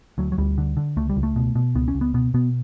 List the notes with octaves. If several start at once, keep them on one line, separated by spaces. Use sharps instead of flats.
D2 F#3
F#3
D2 G3
D3
D3
C#2 A3
G3
C#2
A3
B2
B2
C#2 B3
C#4
C#2
B3
B2 B3
B2 B3